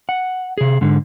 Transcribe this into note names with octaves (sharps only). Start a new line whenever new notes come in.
F#5
C3 G#4
G#2 D3